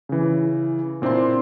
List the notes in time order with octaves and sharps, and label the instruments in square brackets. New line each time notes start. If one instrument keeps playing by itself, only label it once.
[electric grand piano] C#3 E3
A#2 C4 D4 E4 C6